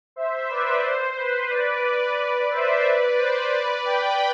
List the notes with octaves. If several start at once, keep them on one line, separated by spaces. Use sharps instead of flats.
C5 E5
B4 D5
C5
B4
B4 D5
C5 E5
B4 D5
C5
B4 D5
G5 B5